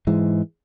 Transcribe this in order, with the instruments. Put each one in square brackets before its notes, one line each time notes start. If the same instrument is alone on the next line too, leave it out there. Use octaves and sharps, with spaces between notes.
[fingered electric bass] G#2 E3 G#3